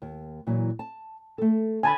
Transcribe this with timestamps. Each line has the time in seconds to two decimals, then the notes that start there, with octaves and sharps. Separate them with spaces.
0.02 D#2 A#3
0.47 A#2 E3 F#3
0.79 A5
1.38 A3 A4
1.83 D3 G#5 A5 B5